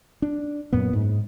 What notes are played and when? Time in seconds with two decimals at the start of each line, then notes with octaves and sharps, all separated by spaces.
0.22 D4
0.73 F#2 A#2 B3
0.93 G#2